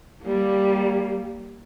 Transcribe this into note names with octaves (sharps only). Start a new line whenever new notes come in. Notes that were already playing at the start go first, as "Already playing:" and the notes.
G3 A#3